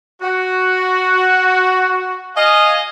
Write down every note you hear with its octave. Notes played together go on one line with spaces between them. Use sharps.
F#4
D#5 F5 G#5